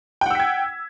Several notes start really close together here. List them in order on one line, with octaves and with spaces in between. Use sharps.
G5 F#5 E6 B6 G#6